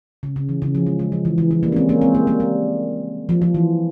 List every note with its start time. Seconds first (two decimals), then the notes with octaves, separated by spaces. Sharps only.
0.23 C#3
0.36 C#3
0.49 E3
0.62 C#3
0.75 F3
0.86 G#3
0.99 G#3
1.12 F3
1.25 E3
1.38 E3
1.51 E3
1.63 G3 A#3
1.72 C#4
1.76 G#3 C4
1.89 A#3 C#4
2.01 G#3 C4
2.15 G3 A#3
2.27 G3 A#3
2.40 G3
3.29 F3
3.42 F3
3.54 E3